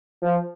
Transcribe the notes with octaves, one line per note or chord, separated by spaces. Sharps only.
F3